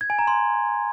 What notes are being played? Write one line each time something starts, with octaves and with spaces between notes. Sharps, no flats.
G#6
G#5
A#5
C6